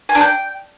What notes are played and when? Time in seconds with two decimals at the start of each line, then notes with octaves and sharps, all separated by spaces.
0.09 G#5
0.15 D4
0.21 G5